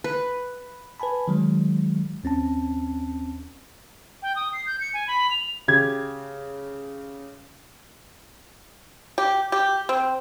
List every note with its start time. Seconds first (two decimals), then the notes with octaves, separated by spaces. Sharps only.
0.04 B4
1.00 B4 G#5 A5 B5
1.28 D#3 F#3 G#3
2.24 D#2 C4 C#4 A5
4.22 G5
4.36 D#6
4.53 C7
4.66 G6
4.80 C#7
4.94 G#5
5.08 B5
5.31 F7
5.68 C#3 G4 G#6
9.18 G4
9.52 G4
9.89 C4